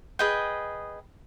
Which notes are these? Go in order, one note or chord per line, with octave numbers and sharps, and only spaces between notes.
G#4 B4 D#5 G5